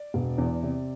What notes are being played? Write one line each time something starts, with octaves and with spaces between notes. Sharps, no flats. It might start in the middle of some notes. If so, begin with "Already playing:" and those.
Already playing: D5
E1
E2
C3